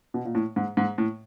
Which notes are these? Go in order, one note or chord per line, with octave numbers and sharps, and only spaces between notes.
B2
A#2
A2
G#2
G#2
A2